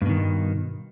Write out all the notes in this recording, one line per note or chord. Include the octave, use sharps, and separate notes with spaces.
G2 B2 D#3